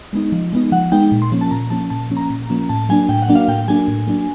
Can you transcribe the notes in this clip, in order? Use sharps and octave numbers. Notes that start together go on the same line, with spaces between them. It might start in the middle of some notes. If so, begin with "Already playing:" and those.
Already playing: D#5
G#3 B3 D#4
F3
G#3 B3 D#4
F3 F#5
G#3 B3 D#4 G5
A#2
C6
F3 A#3 C#4
A5
A#2 A#5
F3 A#3 C#4 A5
A#2 A5
F3 A#3 C#4
A#5
A#2
F3 A#3 C#4
A2 A5
F#3 A#3 D4 G#5
A2 G5
F#5
F#3 A#3 D4
F5
A2 G5
F#3 A#3 D4 G#5
A2
F#3 A#3 D4